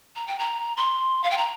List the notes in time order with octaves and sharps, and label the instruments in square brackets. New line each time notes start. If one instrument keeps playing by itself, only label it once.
[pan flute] A#5
G5
A#5
C6
F5
G5
A#5